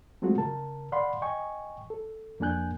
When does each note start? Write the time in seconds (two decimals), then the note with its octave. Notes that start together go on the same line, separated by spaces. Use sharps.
0.22 F#3 G#3 A3 C4 F4 F#4
0.38 C#3 A#4 A5
0.92 D5 F5 F#5 B5 C6
1.22 D#5 G5 G#5 C#6
1.90 A4
2.40 F2 A#3 D4 G#5 F#6 G6